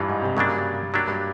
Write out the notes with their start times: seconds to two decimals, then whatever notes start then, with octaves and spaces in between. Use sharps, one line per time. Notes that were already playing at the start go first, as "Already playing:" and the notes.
Already playing: G2 E3 F4
0.08 G#2
0.22 C3
0.37 G2 C#3 F#3 A#3 D4
0.94 F#3 A#3 D4 G4
1.08 G2